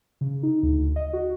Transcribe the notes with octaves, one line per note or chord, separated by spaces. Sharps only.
C#3
D#4
D2
D#5
F#4